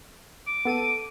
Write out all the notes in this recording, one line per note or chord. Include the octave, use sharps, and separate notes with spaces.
D6
B3 A4 D#7